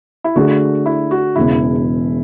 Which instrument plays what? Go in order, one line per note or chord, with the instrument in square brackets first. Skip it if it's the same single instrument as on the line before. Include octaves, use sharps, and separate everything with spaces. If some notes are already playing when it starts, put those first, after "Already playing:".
[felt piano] E4
[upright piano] D3 A3 D4 G#4 [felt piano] F#4
[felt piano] E4
F#4
[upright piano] E1 E2 C#3 [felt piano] E4